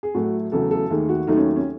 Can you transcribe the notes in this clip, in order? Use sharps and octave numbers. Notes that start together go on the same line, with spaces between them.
G#4
A2 F#3 A3 F#4
E2 C#3 F#3 A3 A4
A4
D#2 D#3 A3 G#4
F#4
D#2 D#3 F#3 A3 D#4
C#4
C#4